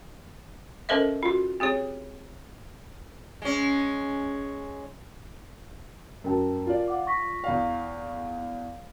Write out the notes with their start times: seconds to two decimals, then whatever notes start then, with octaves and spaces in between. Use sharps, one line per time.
0.89 C#4 A4 A#4 C5 D#5 E5
1.23 F4 F#4
1.60 C4 G4 G#4 C#5
3.42 G#3 C#4
6.24 F#2 A#4 G5 A5
6.67 F4 D5
6.88 F5 F#5 D6
7.07 C#6 A#6 B6
7.44 E2 F5